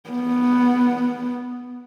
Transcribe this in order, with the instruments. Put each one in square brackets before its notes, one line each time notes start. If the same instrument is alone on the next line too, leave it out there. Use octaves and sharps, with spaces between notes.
[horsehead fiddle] B3